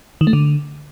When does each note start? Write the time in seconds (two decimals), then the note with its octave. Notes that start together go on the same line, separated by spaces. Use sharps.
0.21 D#3
0.27 A3
0.33 D3